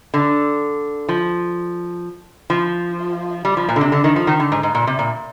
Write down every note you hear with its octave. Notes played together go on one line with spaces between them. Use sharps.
D3
F3
F3
G3
F3
A#2
D3
C3
D3
D#3
F3
D#3
D3
G#2
G#2
A#2
C3
A#2